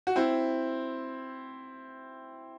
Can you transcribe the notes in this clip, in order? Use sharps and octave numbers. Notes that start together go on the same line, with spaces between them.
F#4
C4 E4